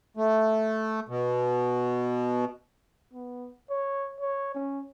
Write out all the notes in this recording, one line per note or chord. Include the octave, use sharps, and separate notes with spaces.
A3
B2
B3
C#5
C#5
C#4